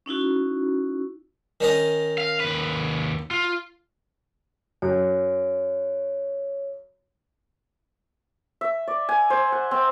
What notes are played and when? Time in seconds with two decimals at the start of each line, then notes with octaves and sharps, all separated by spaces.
0.06 C#4 D#4 E4 F#4
1.60 D#3 C#4 D#5
2.18 F5
2.40 D#2 B4
3.31 F4
4.82 F#2 C#5
8.61 E5
8.88 D5
9.09 G#5
9.30 C5
9.52 F#5
9.71 C4